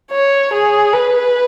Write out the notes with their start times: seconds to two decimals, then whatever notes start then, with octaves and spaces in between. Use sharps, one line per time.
0.12 C#5
0.53 G#4
0.93 B4